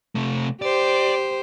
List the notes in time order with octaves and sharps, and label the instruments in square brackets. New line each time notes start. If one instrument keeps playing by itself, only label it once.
[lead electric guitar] C3 A3
[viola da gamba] G4 C5 [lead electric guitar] D5